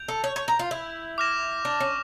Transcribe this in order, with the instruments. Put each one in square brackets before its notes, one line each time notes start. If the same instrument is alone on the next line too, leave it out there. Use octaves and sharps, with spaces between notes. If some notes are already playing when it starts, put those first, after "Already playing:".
Already playing: [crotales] G6 D7 F7
[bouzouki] A4
C#5
C#5
A#4
F4
E4
[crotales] D6 F6 A#6 E7
[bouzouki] D4
C#4